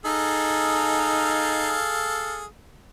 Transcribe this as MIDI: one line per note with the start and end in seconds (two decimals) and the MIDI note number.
0.05 1.77 63
0.05 2.45 68
0.05 2.45 69
0.05 2.45 77